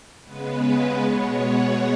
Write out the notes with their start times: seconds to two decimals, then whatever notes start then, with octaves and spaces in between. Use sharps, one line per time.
0.24 C#3 G#3 B3 B4
1.00 B2 G#3 B3 C#5
1.38 F#5